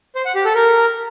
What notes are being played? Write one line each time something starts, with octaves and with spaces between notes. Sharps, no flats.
C5
F#5
G4
A4
A#4